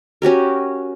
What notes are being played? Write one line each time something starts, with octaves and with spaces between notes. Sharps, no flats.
C#4 F#4 G4 A#4